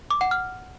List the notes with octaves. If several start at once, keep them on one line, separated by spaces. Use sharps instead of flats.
D6
F#5
F6